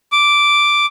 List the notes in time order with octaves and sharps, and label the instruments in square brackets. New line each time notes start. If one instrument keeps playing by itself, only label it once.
[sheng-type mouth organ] D6